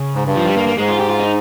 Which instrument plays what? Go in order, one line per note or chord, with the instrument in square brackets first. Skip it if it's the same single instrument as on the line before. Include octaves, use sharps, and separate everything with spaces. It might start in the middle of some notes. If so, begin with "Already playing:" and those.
Already playing: [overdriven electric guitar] C#3
[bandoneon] G#2
G2
[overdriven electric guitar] F3
G3
A#3
A#3
[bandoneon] G#2 [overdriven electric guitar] G#3
[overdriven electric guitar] F4
G4
F4
D#4